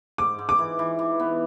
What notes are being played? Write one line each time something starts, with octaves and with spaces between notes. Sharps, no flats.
G#2 D6
G#2
D6
E3
E3
E3
B3